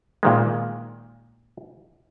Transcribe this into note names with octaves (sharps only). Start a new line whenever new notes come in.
A#2 D#3 G#3